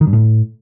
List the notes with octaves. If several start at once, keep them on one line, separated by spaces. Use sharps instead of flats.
D#3
G2
A2